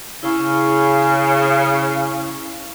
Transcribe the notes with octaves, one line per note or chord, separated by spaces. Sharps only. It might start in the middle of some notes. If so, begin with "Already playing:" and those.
C#3 E4 C#6